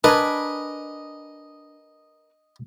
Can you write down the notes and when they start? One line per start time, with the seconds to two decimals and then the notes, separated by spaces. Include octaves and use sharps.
0.04 D4 A#4 B4 D#5 G#5